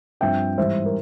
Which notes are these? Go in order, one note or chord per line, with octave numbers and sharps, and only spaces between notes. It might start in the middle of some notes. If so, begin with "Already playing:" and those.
G2 F3 C4 E5 G5
G#2 E3 G3 C5 E5
A#4